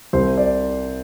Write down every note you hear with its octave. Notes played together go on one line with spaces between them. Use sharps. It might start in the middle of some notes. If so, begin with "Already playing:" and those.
C2 C3 C5
D5